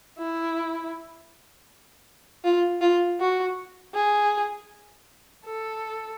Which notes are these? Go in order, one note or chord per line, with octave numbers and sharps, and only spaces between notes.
E4
F4
F4
F#4
G#4
A4